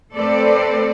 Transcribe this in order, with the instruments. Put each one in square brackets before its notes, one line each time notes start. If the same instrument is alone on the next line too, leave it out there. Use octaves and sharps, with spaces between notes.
[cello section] A3 C4 A4 B4 D5